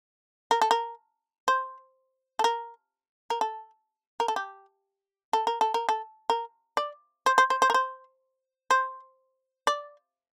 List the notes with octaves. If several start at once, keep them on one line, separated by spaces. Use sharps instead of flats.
A#4
A4
A#4
C5
A4
A#4
A#4
A4
A#4
A4
G4
A4
A#4
A4
A#4
A4
A#4
D5
C5
C5
C5
C5
A#4
C5
C5
D5